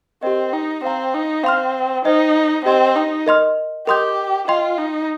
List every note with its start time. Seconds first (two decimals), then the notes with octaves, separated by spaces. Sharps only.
0.23 C4 G4 A#4 D#5
0.53 D#4
0.83 C4 C5 F5 A#5
1.14 D#4
1.44 C4 F5 C6 F6
2.05 D#4 C5 D#5 G5
2.65 C4 G4 D#5 C6
2.96 D#4
3.26 A#4 D#5 C6 F6
3.87 G4 A#4 D#5 C6 D#6 G6
4.48 F4 D#5 G5 C6
4.78 D#4